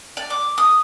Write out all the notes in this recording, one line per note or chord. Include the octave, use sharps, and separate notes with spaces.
D5
D6
D#6